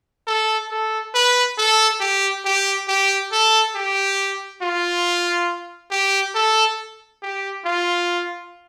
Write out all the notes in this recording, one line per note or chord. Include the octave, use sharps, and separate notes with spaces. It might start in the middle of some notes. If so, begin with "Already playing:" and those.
A4
A4
B4
A4
G4
G4
G4
A4
G4
F4
G4
A4
G4
F4